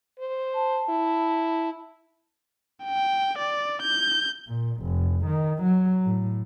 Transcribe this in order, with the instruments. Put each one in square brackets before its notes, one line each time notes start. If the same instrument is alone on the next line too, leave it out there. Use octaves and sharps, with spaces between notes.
[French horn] C5
[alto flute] A5
[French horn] E4
[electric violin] G5
D5
G6
[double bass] A#2
F1
D#3
F#3
A2